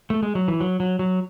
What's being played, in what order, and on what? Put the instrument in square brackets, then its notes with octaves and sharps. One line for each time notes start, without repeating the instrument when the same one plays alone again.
[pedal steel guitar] A3
G#3
F#3
E3
F#3
F#3
F#3